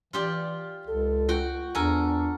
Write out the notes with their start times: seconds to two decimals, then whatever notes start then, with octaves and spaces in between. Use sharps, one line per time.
0.13 E3 F4 G4 D5
0.87 C#2 A4
1.29 F4 F#4 G5
1.75 E2 D4 A4 A#4 G#5